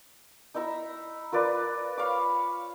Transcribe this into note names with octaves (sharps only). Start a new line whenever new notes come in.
D#4 E4 E5 A#5
F4 A#4 B4 D5
C#5 F5 B5 D6